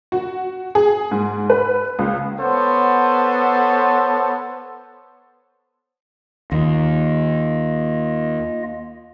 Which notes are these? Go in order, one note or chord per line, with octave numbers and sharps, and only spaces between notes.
F#4
G#4
G#2
B4
C#2
B3 A4 C5 C#5 F#5 A5
D#2 A#3 F4 D#5